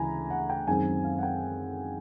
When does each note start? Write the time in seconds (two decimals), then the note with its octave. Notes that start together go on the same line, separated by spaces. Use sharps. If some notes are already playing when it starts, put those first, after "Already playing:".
Already playing: D2 C#3 E3 G#3 G#5 A#5 B5
0.30 F#5
0.50 G5
0.67 F#2 D#3 G#3 C4 G#5
1.04 F5
1.19 F#5
1.23 G5